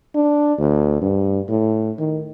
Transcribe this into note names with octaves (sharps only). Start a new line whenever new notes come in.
D4
D2
G2
A2
D#3